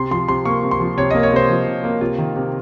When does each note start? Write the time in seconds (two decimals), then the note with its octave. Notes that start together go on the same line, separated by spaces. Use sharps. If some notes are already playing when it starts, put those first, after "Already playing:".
Already playing: C3 C6
0.11 F3 C6
0.28 C3 C6
0.45 A#3 C#6
0.63 C3
0.71 C6
0.80 F3
0.97 C3 C#5
1.11 A#3 D#5
1.23 C#5
1.32 C3 C5
1.50 F3
1.66 C3
1.84 A#3
2.01 C3 F4
2.18 D#3
2.36 C3